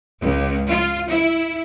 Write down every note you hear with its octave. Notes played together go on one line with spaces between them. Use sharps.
C#2
F4
E4